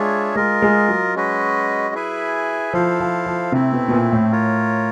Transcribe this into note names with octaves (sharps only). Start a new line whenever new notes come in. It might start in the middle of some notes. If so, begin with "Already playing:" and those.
Already playing: G#3 D4 F4 G#4 C#5 E5
G#3 F4 A#4 D#5
G#3
F#3
G#3 C#4 F#4 B4 D#5
E4 G#4 B4 E5 G#5
F3 E4 A4 C5 F5
F3
F3
C3 A3 C4 E4
B2
B2
A#2
A2
F4 A#4 C#5